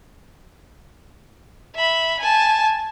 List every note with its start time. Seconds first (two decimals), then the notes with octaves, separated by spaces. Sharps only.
1.75 E5 B5
2.20 G#5 A5